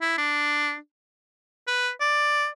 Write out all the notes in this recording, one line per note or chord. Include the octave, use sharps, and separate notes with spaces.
E4
D4
B4
D5